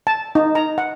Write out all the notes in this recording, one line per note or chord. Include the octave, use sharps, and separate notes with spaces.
A5
D#4
A#5
F#5